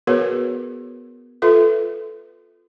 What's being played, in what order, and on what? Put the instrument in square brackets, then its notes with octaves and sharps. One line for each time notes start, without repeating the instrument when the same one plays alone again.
[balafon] B3 F#4 G#4 A#4 B4 C#5
F4 A4 B4 E5